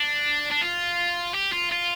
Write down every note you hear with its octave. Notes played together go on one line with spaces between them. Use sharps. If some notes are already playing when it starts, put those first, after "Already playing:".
Already playing: D4
D4
F4
G4
F4
F4